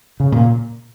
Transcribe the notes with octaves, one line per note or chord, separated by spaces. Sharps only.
C#3
A#2